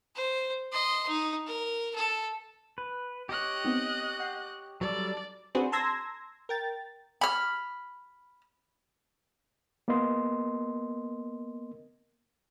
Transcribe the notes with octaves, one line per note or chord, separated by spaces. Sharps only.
C5
D#5 C6
D#4
A#4
A4
B4
G4 C#5 D#5 F#6
B3 C4 D#4
F#5 G6 C7
F#3 G3 A4 D5
C4 D4 F#4 G#4 B4 C5
A5 A#5 C6 E6 G#6 A#6
A#4 G5 A6
B5 F6
A#3 B3 A#4 D#5 C6